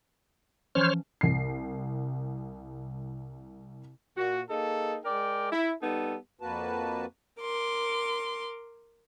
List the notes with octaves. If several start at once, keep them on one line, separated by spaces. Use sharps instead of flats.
E3 F3 C#4 C5 C#5 F6
C2 C7
A#2 F#4
A#3 D#4 G#4 A4
G#3 A#4 D5 G5
E4
G3 B3 D#4 A4
F2 A#3 F#4 B4 A5
A#4 C6 D6